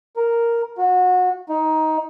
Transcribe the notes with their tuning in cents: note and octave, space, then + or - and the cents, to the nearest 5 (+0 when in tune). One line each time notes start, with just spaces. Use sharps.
A#4 +0
F#4 -25
D#4 +15